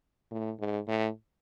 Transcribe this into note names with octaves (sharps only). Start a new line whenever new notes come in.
A2
G#2
A2